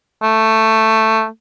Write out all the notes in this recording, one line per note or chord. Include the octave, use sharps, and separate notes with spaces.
A3